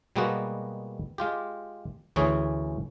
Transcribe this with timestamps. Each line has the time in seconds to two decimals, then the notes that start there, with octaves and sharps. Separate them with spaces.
0.16 B2 G3 G#3 A#3 B3 F#4
1.18 G#3 F4 G4
2.16 D2 E3 C#4 G#4 C#5 G#5